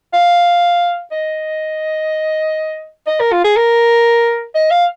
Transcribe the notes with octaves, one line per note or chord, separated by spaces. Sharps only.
F5
D#5
D#5
A#4
F4
G#4
A#4
D#5
F5